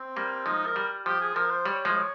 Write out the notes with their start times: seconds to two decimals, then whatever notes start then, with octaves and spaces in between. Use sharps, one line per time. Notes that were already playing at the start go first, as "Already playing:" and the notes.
Already playing: C4
0.16 G3 A#3
0.46 F3 G#3 D#4
0.66 A#4
0.76 G3
1.06 F3 G4
1.21 G#4
1.36 F3 A#4
1.50 C5
1.66 G3 C#5
1.85 F3 G#3 C#5